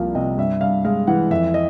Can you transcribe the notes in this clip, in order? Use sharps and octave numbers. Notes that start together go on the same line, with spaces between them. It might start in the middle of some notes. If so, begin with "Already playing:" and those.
Already playing: C2 F3 A#3 F5
C3 D#5
G2 E5
G2 F5
G#3 F5
E3 F#5
F2 E5
D#5